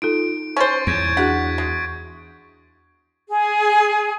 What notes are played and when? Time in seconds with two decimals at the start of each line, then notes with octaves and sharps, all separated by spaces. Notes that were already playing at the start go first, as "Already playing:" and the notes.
0.02 D#4 F4 A4 D7
0.57 C#4 C5 C#6 A6
0.87 E2 G6 G#6 D7
1.17 D4 F#4 G#4 F#5 B6
1.58 G#3
3.29 G#4